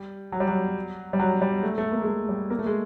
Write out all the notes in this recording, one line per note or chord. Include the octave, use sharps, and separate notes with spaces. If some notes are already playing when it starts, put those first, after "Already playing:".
Already playing: G3
F#3
G3
F#3
G3
F#3
G3
A3
A3
A#3
G#3
A3
G3
A#3
A3
G#3